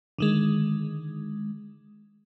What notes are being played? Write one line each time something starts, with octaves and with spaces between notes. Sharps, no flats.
D3 D#3 G#3